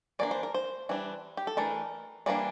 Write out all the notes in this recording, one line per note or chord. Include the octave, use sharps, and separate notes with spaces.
E3 A#3 D4 D5
C5
A#4
C5
E3 G3 D4
G4
A4
E3 A3 D4 A#4
E3 G3 A#3 D4 D5